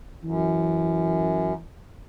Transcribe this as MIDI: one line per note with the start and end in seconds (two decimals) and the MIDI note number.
0.24 1.53 42
0.24 1.61 52